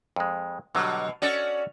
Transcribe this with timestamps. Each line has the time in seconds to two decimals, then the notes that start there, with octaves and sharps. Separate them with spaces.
0.16 F2 G#3
0.75 B2 D3 F#3 G3
1.22 C#4 F#4 A4 D5 D#5 G#5